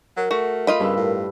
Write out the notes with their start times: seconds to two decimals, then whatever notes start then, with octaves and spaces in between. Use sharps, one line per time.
0.17 F#3 A#4
0.31 A3 F#4
0.67 F4 D#5 B5
0.80 G2 C#3 B4 E6
0.97 A2